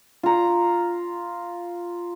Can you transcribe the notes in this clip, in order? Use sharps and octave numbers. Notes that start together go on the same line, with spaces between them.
F4 A#5